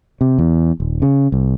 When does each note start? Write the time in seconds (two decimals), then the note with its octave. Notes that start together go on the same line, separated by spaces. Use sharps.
0.21 C3
0.39 E2
0.80 D#1
1.02 C#3
1.32 C2